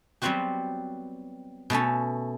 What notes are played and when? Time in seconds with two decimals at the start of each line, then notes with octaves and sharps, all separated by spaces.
0.22 F#3 G3 B3 C4 F#4 G4
1.70 B2 A3 C#4 A4